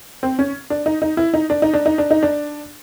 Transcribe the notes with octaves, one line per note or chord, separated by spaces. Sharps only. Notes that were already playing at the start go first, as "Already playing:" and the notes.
C4
C#4
D4
D#4
D#4
E4
D#4
D4
D#4
D4
D#4
D4
D#4
D4